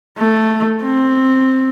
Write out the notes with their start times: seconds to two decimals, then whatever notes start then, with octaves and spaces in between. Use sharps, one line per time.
0.18 A3
0.83 C4